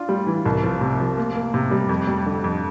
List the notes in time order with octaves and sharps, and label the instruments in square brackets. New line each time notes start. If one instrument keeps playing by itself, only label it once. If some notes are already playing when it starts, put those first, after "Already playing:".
Already playing: [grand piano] D4 F4
G3
E3
C2
F3
C3
F3
A#3
A#3
C3
G3
F2
G3
D3
F2